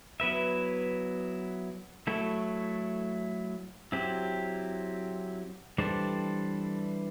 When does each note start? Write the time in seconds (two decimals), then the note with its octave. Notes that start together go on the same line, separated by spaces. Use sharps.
0.20 F#3 B3 E4 B4 E5
2.07 F#3 A3 E4 A4
3.92 F#3 C4 E4 G4
5.78 E3 G3 D4 A4 C5